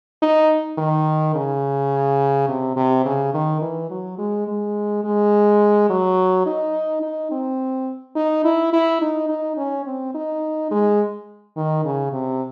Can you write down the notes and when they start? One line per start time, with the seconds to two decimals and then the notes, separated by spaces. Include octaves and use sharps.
0.22 D#4
0.78 D#3
1.35 C#3
2.48 C3
2.76 C3
3.05 C#3
3.34 D#3
3.61 E3
3.90 F#3
4.18 G#3
4.47 G#3
5.04 G#3
5.89 F#3
6.46 D#4
7.02 D#4
7.31 C4
8.16 D#4
8.44 E4
8.73 E4
9.01 D#4
9.29 D#4
9.57 C#4
9.85 C4
10.14 D#4
10.71 G#3
11.56 D#3
11.85 C#3
12.12 C3